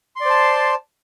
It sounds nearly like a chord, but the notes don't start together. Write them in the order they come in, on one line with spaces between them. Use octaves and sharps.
C6 D5 C5 A5